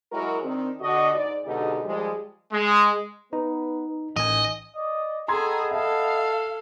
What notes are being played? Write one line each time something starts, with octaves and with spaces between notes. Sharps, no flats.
F#3 G#3 E4 F#4 A#4
D#3 C4 D4
D3 F#4 D#5
G#2 D5
D#2 B2 D3 G#3 D#4 G4
D#3 F3 G3 G#3
G#3
B3 D#4 B4
A1 D#3 D#5 G#5
D5 D#5
B3 G#4 A4 D#5 G5 A#5 C6 G#6
A4 E5 F5 A5